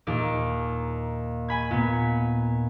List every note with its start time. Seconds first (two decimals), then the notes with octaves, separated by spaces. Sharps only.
0.07 D#2 A#2 D5
1.48 G#5 B5 G#6
1.71 A#2 B3